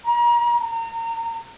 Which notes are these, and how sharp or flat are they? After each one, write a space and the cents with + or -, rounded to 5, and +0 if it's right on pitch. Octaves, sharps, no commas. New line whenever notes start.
A#5 +35
A#5 -30